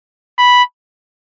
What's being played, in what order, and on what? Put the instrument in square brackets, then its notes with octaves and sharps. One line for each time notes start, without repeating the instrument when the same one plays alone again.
[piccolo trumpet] B5